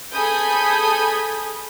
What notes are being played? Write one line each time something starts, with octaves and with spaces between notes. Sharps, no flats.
G#4 A4 G#5 B5 D#6 G6